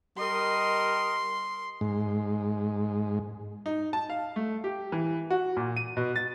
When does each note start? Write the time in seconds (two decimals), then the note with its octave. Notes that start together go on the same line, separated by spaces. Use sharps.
0.18 G3 A#4 D#5 C6
1.81 G#2
3.66 D#4
3.93 A5
4.10 F5
4.36 A3
4.64 G4
4.92 E3
5.30 F#4
5.57 A#2
5.77 D#7
5.97 B2
6.16 A6